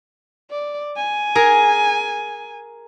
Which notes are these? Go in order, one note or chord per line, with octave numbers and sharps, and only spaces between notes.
D5
G#5
G#4 A#4